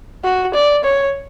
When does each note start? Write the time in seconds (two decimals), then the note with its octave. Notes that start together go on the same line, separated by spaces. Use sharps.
0.24 F#4
0.54 D5
0.84 C#5